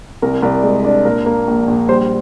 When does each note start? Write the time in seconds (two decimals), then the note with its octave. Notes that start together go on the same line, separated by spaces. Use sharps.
0.22 C2 A#4
0.42 C2 D5
0.63 G#3
0.85 D4 D5
1.05 A#2 A#4
1.26 A#3
1.47 A#1
1.67 A#1
1.89 G3 C5